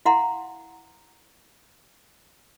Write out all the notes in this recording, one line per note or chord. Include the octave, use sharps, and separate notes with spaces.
E4 F5 F#5 A#5 C6